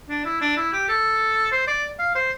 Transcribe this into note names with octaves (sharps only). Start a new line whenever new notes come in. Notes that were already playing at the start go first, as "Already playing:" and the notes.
D4
E4
D4
E4
G4
A4
C5
D5
F5
C5